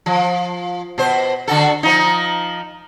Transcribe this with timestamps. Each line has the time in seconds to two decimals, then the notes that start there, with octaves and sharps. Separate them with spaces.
0.06 F3
0.98 B2 C5
1.48 D3 F#4 A4
1.83 F3 D#4